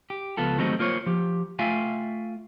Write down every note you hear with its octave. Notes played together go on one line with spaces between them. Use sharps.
G4
C#2 F3 B3 F4 A4
D#3 F#3 G3 A3 C4 D#4
A#3 F4 C5 C#5
F3 G4
A3 F4 E5 F5 G5 G#5